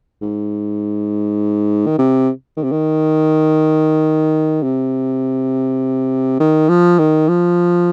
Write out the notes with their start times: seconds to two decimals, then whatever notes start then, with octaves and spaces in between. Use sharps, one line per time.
0.22 G#2
1.86 D#3
1.98 C3
2.57 D#3
2.64 C3
2.72 D#3
4.63 C3
6.40 D#3
6.69 F3
6.99 D#3
7.28 F3